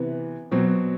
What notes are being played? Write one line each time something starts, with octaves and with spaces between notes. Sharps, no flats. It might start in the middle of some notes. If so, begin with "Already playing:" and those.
Already playing: C3 E3 B3
B2 F#3 C4